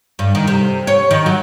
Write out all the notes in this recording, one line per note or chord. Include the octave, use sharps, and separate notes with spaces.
G2
D#3
C3
C#5
D#3
F#3